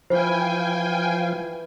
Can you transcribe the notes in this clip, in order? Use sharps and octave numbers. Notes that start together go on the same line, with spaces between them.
E3 F3 C5 F5 G5 G#5 B5